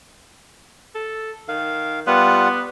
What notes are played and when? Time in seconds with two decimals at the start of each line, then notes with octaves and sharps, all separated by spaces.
0.95 A4
1.48 D#3 F5
2.07 G3 B3 F4 F#5